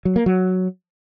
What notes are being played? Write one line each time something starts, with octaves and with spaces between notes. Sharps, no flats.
F#3
A#3
F#3